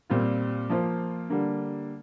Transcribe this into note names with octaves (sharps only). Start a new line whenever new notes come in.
A#2 G3 C4 F4
F3 A#3 F4 C5
D3 G3 A#3